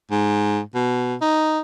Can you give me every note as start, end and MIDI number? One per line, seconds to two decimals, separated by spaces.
0.11 0.61 44
0.75 1.15 47
1.22 1.60 63